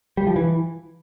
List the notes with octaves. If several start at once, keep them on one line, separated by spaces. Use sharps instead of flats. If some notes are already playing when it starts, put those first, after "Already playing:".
G3
F3
E3